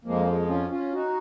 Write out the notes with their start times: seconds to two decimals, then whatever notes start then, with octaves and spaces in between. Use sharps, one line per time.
0.04 F2 F3 G#3 A#3
0.27 G#3
0.48 C#4 F4
0.70 C#4 F4
0.92 D#4 F#4